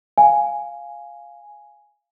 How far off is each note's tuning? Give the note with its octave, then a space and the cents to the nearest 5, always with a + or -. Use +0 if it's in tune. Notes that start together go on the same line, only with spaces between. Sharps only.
F5 +0 G#5 +0